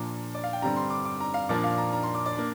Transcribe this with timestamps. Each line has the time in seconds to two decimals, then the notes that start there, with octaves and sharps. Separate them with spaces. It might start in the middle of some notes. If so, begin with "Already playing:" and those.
Already playing: A#2 F3 A#3 D4 A#5
0.35 D5
0.44 F5
0.53 G5
0.62 G2 D3 G3 C4 A#5
0.76 C6
0.90 D6
1.05 D6
1.20 A#5
1.34 F5
1.49 A#2 F3 A#3 D4 D5
1.64 F5
1.78 A#5
1.93 A#5
2.03 C6
2.15 D6
2.26 D5
2.36 A#3 D4